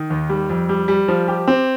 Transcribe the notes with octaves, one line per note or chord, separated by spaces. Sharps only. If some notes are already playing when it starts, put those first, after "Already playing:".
Already playing: D#3
D#2
G3
F2
G3
G3
F3
G4
C4